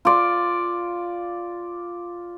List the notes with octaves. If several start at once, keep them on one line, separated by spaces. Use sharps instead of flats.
F4 D5